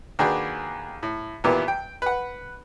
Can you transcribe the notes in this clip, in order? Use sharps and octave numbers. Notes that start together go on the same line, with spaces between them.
D#2 D4 F#4 G#4 B4 G5
A2
E2 A#2 D#3 B3 E4 G4
G5
B4 F#5